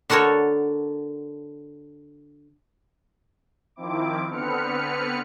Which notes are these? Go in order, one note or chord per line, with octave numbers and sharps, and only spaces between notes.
D3 F#4 A4 A#4 C#5
D#3 F3 C4 E4 D6
D3 B3 C4 B4 F6 C#7